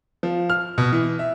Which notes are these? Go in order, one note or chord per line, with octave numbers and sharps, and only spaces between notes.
F3
F6
B2
E3
E5